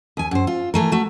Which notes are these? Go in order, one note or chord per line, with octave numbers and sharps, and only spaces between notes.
D#2 G#5
F#2 C5
F4
E3 A3 A#4
A3 F#4